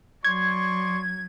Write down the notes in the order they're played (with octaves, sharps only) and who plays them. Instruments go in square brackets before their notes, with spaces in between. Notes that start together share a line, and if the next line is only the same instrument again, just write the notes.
[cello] F#3 [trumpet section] D5 C6 C#6 [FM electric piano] G#6